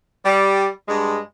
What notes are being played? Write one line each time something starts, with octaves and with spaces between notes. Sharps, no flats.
G3
G2 G#3